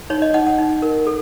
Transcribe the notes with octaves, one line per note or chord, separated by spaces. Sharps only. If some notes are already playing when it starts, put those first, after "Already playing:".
D#4 C#5
D#5
D#4 F#5
F#5
D#4
A#4
A4